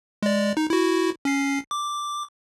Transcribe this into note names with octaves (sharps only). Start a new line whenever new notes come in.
G#3 D5
D#4
E4 F#4
C#4 C7
D6